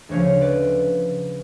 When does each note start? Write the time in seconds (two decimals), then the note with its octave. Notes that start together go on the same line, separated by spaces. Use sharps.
0.09 D2 C#3 F3 C#5 F5
0.41 B4 D5